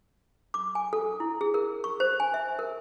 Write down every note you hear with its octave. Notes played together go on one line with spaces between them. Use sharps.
D6
G#5
A4
E4
G#4
A#4
C#6
C5
G#5
E5
A#4